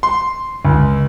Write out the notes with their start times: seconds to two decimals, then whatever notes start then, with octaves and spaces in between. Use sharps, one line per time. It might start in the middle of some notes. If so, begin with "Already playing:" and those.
0.03 C6
0.65 C#2